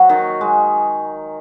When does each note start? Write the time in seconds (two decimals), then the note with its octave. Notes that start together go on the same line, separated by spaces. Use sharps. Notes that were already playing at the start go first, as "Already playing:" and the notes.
Already playing: F#3
0.09 D#3
0.41 G#3